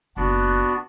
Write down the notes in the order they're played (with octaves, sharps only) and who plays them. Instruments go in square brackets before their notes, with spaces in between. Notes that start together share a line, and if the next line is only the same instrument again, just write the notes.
[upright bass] F#1 [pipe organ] B3 D4 F#4